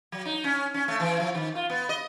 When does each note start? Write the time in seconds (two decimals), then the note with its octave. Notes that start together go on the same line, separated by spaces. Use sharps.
0.12 F#3
0.25 D#4
0.44 C#4
0.74 C#4
0.88 A3
1.00 E3
1.20 F3
1.35 D#3
1.55 F4
1.70 B3
1.89 D#5